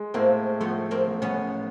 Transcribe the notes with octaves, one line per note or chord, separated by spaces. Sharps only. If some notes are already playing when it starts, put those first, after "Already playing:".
Already playing: G#3
A2 A#3 C4
F3 A3 B3
A#3 C4
A1
B3 C#4